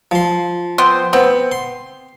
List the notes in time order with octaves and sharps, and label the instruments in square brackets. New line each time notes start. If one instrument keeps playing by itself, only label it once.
[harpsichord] F3 C6
[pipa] B3 C4 C5
[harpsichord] B3 [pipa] C4
[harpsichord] C6